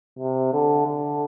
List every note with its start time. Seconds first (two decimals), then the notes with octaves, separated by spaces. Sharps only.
0.19 C3
0.53 D3
0.87 D3